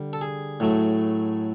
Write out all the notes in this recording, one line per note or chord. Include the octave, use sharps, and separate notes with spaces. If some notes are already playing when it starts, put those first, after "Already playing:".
Already playing: D3 G3
A4
G#4
A2 F#3 A3